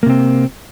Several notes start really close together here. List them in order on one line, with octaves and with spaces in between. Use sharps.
A#3 C3 C4